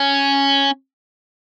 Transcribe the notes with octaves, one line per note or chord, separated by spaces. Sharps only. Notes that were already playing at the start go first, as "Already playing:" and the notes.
Already playing: C#4